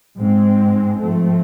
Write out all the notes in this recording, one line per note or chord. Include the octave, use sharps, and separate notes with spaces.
G#2 G#3 C4
G#2 F3 A3 C4